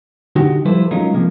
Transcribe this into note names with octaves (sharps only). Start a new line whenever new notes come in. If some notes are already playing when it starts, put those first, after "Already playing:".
D3 D#4 F#4 G4
F3 G3 E4 A4 B4 C5
F#3 G#3 C#4 D#4 F4 A#4
C3 F3 G#3 A#3